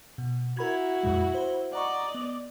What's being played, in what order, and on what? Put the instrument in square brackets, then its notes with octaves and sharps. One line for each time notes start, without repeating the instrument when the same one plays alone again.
[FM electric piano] B2
[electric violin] E4 F#4 [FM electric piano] A#4 B5 G#6
[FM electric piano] F2 A#2 G#3
C5
[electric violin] D5 D#5 [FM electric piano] F#5 A#5 C#6
[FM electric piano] B3